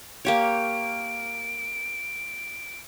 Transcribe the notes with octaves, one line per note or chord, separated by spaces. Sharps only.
A#3 G4 C#5 D7